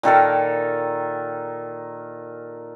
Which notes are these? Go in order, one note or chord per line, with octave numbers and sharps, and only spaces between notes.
A#2 D#3 A4 A#4